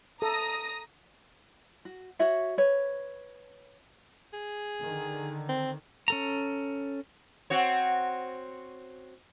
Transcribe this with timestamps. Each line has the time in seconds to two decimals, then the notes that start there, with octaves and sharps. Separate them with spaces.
0.22 A4 A#5 D#6 A#6
1.85 F#4
2.19 F#4 C#5 E5 F#5
2.58 B4 C#5
4.33 G#4
4.82 D3 D#3
5.49 C4
6.08 C#4 A4 A#5
7.50 C4 F#4 C#5